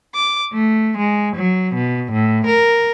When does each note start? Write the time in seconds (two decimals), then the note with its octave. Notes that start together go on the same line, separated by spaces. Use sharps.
0.15 D6
0.53 A3
0.96 G#3
1.36 F#3
1.74 B2
2.12 A2
2.45 A#4